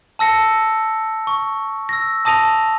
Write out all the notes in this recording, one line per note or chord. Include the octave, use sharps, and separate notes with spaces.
A5 E6 A#6 C#7
C#6
E6 A#6
A5 D#6 A#6 D#7 F7